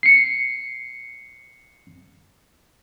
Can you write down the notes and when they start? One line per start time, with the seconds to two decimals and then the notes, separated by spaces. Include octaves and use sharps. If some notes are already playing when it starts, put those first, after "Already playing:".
0.03 C7 C#7